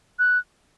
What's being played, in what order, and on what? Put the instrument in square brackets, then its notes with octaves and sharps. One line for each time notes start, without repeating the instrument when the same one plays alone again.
[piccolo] F#6